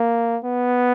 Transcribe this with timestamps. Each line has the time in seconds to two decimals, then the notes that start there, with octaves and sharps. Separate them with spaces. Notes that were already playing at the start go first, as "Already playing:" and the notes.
Already playing: A#3
0.44 B3